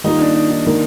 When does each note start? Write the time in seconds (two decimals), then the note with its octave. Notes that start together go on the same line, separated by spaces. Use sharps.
0.04 D#3 G3 A#3 D#4 F4
0.20 D4
0.34 D#4
0.51 D#4
0.66 D#3 A#3